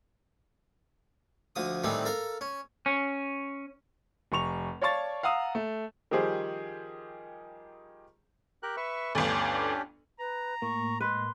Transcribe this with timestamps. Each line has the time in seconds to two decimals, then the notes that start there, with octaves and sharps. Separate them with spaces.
1.56 D2 F3 D#6
1.84 A2 D#3 E3 G3 C4
2.05 A4 A#4 F5
2.41 C#4
2.86 C#4
4.32 F1 A#5 C#6 F7
4.82 C#5 D5 F5 A5 C#6 A6
5.23 F5 F#5 A#5 D#6 E6
5.55 A3
6.11 D#3 F3 G3 G4 G#4 C5
8.63 G4 A#4 F#6
8.77 B4 E5 C#6
9.15 G1 D2 C#4 D4 G4
10.19 B4 A#5
10.62 A2 A#3 C#6
11.00 G#3 B4 C6